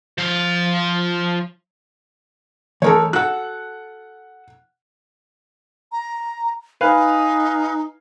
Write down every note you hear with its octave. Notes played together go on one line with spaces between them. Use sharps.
F3 F5
E3 G#3 A3 A4 A#4 C#5
F#4 A4 F#5 F#6
A#5
D#4 B4 F5 G#5